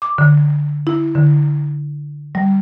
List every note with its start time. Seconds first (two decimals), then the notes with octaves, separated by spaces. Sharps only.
0.02 D6
0.18 D3
0.87 E4
1.15 D3
2.35 G3